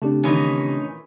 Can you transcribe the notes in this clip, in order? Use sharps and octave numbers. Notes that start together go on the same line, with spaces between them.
C#3 A3 C4 D4 G4
A#2 D#3 E3 C#4 D#4